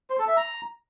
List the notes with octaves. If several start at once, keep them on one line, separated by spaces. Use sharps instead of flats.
C5
A4
E5
A#5